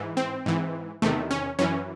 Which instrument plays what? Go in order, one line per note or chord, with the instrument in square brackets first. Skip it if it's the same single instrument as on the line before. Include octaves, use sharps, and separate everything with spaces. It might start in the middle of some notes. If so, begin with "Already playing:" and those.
Already playing: [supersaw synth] G#2 E3
C4
G#2 E3
E2 C3 D#3 A3
C#4
F#2 E3 C#4